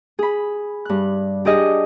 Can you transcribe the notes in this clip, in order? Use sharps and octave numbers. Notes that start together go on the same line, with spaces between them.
G#4 B5
G2 F#6
D4 G4 G#4 D#5